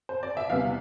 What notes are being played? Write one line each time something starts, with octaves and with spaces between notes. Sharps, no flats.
C5
D5
E5
E2 C3 G3 B3 F5